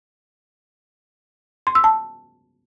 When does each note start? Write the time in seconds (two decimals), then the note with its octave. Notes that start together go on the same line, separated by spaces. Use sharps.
1.67 C6
1.75 E6
1.84 A5